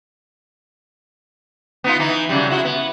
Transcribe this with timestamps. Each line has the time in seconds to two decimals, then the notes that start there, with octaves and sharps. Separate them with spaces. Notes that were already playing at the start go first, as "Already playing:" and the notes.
1.84 B3 D#4 F4
1.99 E3 D#4
2.29 C#3 F#3 G3
2.49 G#3 E4 F#4
2.64 B3